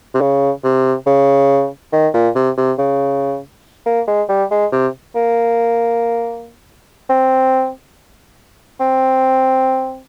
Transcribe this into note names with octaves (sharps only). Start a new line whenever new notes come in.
C3
C#3
C3
C#3
D#3
A#2
C3
C3
C#3
A#3
G#3
G3
G#3
C3
A#3
C4
C4